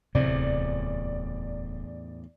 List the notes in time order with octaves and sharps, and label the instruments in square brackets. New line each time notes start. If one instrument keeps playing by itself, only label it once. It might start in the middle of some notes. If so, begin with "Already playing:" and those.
[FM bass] D1 [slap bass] E2 A2 [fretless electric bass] C3 [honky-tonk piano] D5